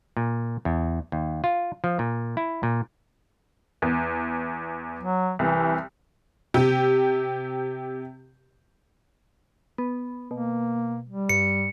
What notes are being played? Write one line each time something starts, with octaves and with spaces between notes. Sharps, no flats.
A#2
E2
D#2
F4
F3
A#2
E4
A#2
E2
F#3
C2 E3
C3 G4
B3
B2 A#3
G3
G2 C#7